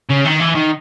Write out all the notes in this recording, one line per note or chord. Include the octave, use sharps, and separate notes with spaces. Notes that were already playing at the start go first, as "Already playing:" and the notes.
C#3
D#3
E3
D#3